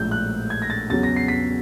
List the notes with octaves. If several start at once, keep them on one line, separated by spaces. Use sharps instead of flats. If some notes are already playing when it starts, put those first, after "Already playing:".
Already playing: A#1 A2 F3 G#3 G6
F#6
G#6
A#6
A6
E2 C#3 F#3 A6
A#6
C7
B6